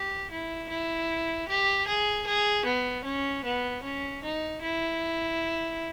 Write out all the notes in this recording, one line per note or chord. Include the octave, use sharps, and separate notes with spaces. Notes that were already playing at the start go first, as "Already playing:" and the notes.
Already playing: G4
E4
E4
G4
G#4
G#4
B3
C#4
B3
C#4
D#4
E4